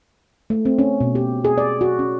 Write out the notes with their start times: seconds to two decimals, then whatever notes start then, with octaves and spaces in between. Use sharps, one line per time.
0.50 A3
0.65 C4
0.79 C#4
1.01 B2
1.15 G4
1.45 G#4
1.58 D5
1.81 F#4
1.99 C#4